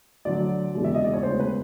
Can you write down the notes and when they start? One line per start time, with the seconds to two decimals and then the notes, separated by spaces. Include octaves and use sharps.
0.25 D2 D3 F#3 D5
0.75 E1 D#2 C#3 E3
0.84 E5
0.94 D#5
1.04 D5
1.14 C#5
1.23 E1 D2 C#3 C5
1.40 B4